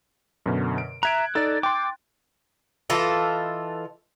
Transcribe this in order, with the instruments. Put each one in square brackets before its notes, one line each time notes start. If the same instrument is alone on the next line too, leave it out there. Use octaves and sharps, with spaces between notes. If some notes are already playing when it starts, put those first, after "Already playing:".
[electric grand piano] F#2 B2 D3
D7
[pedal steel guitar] E5 A#5 [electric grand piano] F#6 G#6 D7
[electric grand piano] D#4 A#5 A6 [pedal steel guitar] A4 D5
[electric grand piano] G5 C6 [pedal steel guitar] D6
[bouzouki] E3 F4 A4 D#5